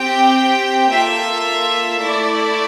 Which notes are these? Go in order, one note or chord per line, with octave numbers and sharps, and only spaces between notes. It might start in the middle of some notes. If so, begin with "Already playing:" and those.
Already playing: C4 G4 G5
A#3 F4 A4 E5
A3 E4 A4 D5